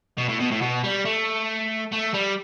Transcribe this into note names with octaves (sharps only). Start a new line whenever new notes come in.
B2
A2
B2
A2
B2
G3
A3
A3
G3